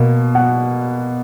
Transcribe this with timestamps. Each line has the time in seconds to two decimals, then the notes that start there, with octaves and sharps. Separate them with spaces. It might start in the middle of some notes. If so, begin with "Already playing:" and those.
Already playing: B2 A#3
0.35 F#5